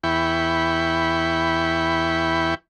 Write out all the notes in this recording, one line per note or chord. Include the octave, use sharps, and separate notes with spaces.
E2 E4 G5 B5 C#6